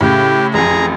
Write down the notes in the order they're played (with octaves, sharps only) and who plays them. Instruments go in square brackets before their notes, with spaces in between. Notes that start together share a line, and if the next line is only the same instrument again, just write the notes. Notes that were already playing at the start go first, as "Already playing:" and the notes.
[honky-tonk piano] A2 C#3 [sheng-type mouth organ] G4
[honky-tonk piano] A1 F2 [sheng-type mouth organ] G#4 A#5